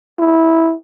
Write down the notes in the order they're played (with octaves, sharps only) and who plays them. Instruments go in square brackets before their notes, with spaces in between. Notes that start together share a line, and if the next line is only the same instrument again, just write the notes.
[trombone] E4